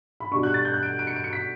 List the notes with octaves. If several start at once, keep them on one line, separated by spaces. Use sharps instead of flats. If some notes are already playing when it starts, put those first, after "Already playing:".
B5
B2 G3 D4 C#6
F#6
A6
G6
F#6
D7
D7
C#7
D7
C#7
B6